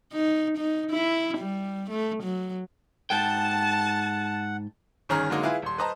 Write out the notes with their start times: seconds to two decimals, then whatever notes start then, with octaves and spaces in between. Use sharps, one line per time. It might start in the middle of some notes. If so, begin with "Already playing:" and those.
0.13 D#4
0.58 D#4
0.91 E4
1.38 G3
1.90 A3
2.23 F#3
3.10 G#2 F#5 G5 A5
5.09 G1 D#3 C#4 G#4 A#5 F6
5.30 D3 F#3 G#3 A#3 D#4
5.43 E4 F4 G#4 B4 F5
5.62 D#1 C6
5.78 B4 C5 D#5 A5 A#5